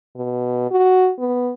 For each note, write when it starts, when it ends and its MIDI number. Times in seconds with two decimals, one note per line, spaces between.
0.16 0.69 47
0.71 1.10 66
1.19 1.51 59